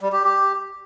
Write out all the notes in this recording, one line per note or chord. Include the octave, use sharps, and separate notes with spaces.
G3
G4
G4